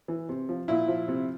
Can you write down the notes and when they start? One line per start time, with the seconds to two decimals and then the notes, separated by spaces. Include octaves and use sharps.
0.08 E3
0.29 C3
0.49 F3
0.68 A#2 E4
0.88 F3
1.08 C3